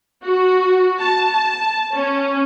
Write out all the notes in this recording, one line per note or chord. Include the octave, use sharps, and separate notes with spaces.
F#4
A5
A5
C#4